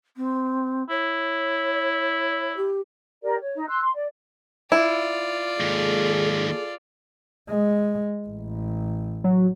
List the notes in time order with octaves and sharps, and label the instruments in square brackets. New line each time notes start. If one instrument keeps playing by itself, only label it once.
[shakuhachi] C4
[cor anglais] E4 [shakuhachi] C#5
[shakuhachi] G4
[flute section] G4 A#4 D5
C#5
D#4
C6 E6 F#6
C6
D5
[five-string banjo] E4 [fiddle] F4 D5
[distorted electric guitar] D#2 G#2 [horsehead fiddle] G#4 A4
[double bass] G#3
A1
[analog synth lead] F#3